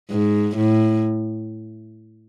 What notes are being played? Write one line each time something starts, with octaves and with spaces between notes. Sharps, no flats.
G#2
A2